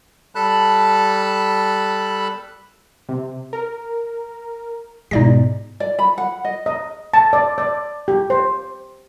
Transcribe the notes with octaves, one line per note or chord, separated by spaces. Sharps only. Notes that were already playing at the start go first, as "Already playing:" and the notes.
G3 A4 A5 B5 F#6
C3
A#4
G#2 B2 G#3 D#4 D5 A#6
D5
B5
F#5
D#5
D#5
A5
D5
D5
G4
C5